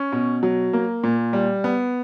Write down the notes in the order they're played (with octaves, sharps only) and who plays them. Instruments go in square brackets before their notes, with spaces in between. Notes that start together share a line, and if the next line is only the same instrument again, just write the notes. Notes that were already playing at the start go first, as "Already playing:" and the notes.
Already playing: [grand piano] C#4
B2
F#3
A#3
A#2
G3
B3